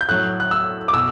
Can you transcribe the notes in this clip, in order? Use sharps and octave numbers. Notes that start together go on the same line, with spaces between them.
G6
A2 F#3 F#6
F#6
E6
D6
B2 E6